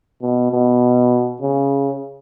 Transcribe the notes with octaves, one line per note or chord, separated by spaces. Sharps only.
B2
B2
C#3